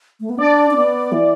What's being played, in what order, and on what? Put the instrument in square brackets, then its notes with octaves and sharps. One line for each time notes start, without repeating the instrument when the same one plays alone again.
[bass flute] A3
B3
[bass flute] D4 [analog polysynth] D5
[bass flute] D4
B3
E3